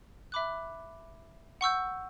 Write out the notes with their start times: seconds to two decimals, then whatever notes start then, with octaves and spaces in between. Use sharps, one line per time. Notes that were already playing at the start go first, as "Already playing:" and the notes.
0.32 E5 B5 D6 F#6
1.61 F#5 C#6 E6 G6